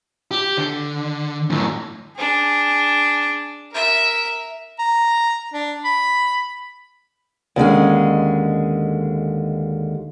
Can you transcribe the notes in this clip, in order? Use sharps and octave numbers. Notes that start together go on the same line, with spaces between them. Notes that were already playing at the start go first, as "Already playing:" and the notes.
G4
D3
F#2 A2
D4 G#4
A#4 E5
A#5
D4
B5
D#2 D3 G#3 C#4